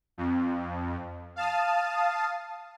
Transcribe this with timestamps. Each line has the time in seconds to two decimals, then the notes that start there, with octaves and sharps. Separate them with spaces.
0.18 F2
1.36 F5 A5 D#6